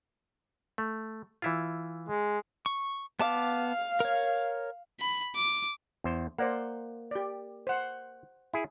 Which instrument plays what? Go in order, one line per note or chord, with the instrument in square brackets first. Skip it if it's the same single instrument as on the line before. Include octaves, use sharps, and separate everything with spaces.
[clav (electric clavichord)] A3
E3 E4 F4
[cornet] G#3
[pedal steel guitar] C#6
[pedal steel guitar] B3 A5 D6 [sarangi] F5
[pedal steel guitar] A#4 C#5
[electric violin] B5
D6
[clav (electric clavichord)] E2 C5
[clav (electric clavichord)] A#3 [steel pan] C5 D5 F#5
[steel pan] G4 D5
C5 F#5
[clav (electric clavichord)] E4 G#4